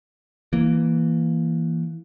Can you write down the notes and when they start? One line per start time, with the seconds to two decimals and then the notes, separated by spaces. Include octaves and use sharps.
0.53 E3 A#3